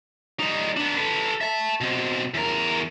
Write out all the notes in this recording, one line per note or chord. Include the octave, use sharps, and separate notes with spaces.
G3 D#4
B3 D4
A4 B4
E5 A5
B2 C4
E2 A#4